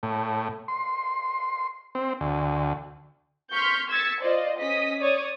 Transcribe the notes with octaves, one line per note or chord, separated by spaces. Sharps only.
A2
C6
C4
D2
C6 C#6 F6 G6 B6
E6 G#6 A6 B6 C#7
F4 C5 D5 D#5
C#4 D#5 D#6 B6
C#5 D5 D#6